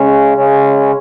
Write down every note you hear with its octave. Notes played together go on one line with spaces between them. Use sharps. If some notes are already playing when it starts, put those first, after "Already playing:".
Already playing: C#3 G#3 C#4
C#3 G#3 C#4